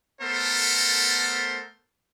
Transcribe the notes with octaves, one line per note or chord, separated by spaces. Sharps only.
A3 B3 A4 A#4 C5